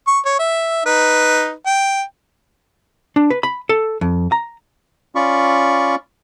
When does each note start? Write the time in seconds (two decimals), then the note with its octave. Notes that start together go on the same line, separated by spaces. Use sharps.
0.07 C#6
0.25 C#5
0.39 E5
0.86 D#4 B4
1.66 G5
3.16 D4
3.30 B4
3.43 B5
3.69 A4
4.01 F2
4.32 A#5
5.15 C#4 F4 D5 B5 C#6